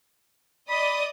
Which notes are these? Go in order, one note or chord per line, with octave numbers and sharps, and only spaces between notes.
D5 D#5 B5 D#6